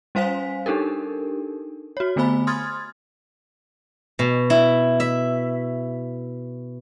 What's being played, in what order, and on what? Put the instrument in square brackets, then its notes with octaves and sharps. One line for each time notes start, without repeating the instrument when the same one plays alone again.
[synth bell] G3 C#4 C5 F5 G#5 B6
D4 D#4 G4 A4 A#4
F#4 C#5
D3 A3 B3 C5 G#5 B5
C6 D#6 F6 G#6 A6
[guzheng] B2
E4
E5